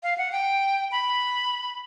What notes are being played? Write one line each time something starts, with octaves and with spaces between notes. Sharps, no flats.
F5
F#5
G5
B5